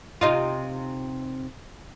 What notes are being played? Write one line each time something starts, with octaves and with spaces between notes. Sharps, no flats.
C3 D#4 F4